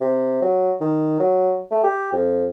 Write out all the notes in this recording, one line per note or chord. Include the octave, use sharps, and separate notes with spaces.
C3
F#3
D#3
F#3
A3
G4
F2